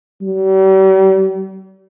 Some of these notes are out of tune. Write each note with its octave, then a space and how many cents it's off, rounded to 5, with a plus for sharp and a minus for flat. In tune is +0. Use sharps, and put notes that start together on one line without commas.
G3 -40